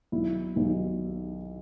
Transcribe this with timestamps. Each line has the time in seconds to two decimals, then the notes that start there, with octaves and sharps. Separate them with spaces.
0.12 B1 E4
0.56 B1